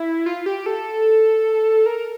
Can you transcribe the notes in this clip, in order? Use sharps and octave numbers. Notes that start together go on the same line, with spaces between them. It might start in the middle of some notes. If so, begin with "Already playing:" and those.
Already playing: E4
F4
G4
A4
A#4